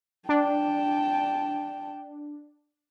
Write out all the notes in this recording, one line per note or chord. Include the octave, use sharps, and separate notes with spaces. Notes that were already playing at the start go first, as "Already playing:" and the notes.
D4 G5 A5